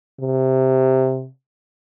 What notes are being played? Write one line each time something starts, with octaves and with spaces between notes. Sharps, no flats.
C3